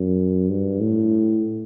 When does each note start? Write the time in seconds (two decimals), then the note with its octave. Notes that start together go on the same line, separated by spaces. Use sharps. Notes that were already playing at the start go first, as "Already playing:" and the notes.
Already playing: F#2
0.50 G2
0.80 A2